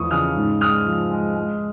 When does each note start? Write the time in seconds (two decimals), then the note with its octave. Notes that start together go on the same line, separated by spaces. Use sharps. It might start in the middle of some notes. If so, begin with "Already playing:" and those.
Already playing: E2 F3 A3 C#6 D#6
0.10 C#3 D#6 F6
0.36 G#2
0.61 G#3 D#6 F6
0.86 F3
1.11 G#3
1.36 G#3